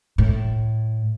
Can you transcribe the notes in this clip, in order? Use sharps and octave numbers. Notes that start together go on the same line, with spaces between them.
A2